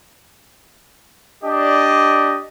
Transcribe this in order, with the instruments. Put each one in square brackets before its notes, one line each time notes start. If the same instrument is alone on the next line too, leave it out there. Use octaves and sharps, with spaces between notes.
[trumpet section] D4 G4 D5 D#5